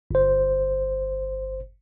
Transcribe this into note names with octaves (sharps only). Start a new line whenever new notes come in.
G1 C5